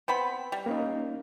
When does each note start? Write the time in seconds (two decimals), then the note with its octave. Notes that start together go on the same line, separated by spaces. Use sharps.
0.08 B3 C4 G5 B5
0.52 G3
0.66 A#3 C#4 D#4